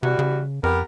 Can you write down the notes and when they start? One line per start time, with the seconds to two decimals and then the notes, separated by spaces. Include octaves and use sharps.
0.03 C3 E3 G3 F#4
0.19 C#3
0.63 F2 B3 G4 A#4